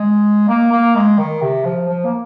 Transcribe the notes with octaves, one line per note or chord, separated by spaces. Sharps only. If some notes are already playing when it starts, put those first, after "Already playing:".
Already playing: G#3
A#3
A#3
G#3
D#3
C3
F3
F3
A#3